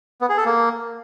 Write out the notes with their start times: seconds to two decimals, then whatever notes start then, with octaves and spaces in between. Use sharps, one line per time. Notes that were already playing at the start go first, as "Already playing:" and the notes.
0.21 B3
0.29 G#4
0.37 A4
0.45 A#3